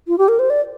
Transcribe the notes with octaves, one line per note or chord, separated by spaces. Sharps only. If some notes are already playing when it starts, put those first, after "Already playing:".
F4
G4
A#4
C5
D5